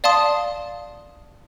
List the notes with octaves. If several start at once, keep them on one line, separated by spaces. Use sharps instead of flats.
D5 F5 A5 C6 D#6